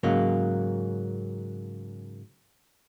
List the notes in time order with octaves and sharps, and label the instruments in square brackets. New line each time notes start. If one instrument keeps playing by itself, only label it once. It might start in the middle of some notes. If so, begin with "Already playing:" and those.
[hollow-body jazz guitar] G#2 C#3 F#3 A#3